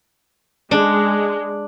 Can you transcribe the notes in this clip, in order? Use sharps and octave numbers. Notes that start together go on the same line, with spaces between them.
G#3 D4